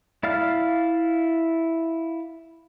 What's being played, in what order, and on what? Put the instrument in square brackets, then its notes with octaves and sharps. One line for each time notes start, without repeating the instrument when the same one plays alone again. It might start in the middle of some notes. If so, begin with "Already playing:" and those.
[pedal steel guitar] E4 D5 F5 F6